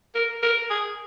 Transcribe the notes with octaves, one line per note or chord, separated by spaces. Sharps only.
A#4
A#4
G#4